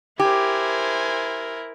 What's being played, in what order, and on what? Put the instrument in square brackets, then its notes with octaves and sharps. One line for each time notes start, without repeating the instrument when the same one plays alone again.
[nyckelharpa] E4 A#4 [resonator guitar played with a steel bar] G4 [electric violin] C5 G#5